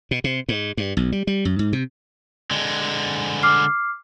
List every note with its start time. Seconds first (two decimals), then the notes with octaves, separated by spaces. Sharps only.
0.11 B2
0.24 C3
0.49 G#2
0.77 G2
0.97 B1
1.12 G3
1.27 G3
1.45 F#2
1.59 G#2
1.73 C3
2.51 D3 G#3
3.43 D6 F6 C7